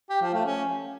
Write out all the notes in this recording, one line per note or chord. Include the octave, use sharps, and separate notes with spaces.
G4
F3
A3
C#4